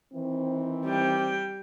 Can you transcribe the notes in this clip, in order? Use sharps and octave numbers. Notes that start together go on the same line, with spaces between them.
D#3 E3 C4
G3 G5